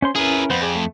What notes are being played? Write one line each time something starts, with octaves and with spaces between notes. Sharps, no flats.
C#4 C5 C6
C#4 E4 G#4 A#4 B4
F2 B3 C5
G#4 D5
A3